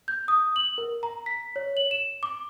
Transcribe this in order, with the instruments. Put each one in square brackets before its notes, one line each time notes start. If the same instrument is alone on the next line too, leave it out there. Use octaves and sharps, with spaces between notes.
[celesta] G6
D#6
F#7
A#4
A#5
B6
C#5
F#7
E7
D6